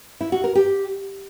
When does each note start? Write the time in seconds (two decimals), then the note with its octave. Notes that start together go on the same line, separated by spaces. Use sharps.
0.21 E4
0.32 F#4
0.44 A#4
0.55 G4